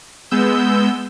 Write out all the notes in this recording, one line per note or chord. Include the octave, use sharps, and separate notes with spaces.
G#3 B3 E6 G6